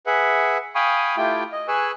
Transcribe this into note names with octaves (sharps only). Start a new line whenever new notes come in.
G#4 B4 E5 F#5
F5 G5 G#5 B5 C#6 D#6
A3 E4 F4 G4 G5
D#5
G#4 B4 G#5 C#6 E6 F#6